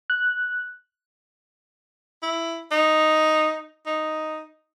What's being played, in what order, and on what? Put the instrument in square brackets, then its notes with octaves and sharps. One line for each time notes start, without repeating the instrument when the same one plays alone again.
[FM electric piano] F#6
[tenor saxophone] E4
D#4
D#4